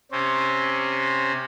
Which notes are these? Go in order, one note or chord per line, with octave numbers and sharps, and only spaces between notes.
C3 C4 C#4